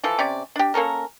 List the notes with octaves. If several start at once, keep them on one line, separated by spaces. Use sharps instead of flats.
E3 F3 A4
C3 C#4 D5
D4 G4
A#3 C#4 A4 A#4